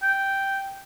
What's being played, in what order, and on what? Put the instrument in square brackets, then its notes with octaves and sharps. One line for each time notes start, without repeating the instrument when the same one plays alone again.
[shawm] G5